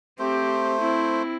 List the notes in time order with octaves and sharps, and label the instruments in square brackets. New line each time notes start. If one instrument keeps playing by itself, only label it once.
[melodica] A3 C5 [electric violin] C4 G4
[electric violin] C4 E4